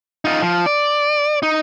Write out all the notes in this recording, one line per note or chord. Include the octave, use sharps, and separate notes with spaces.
D#4 F4
F3
D5
D#4